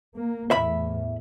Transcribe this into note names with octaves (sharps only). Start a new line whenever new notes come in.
A#3
E2 A2 E5 B5